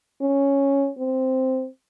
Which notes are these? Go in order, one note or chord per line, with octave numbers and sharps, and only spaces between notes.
C#4
C4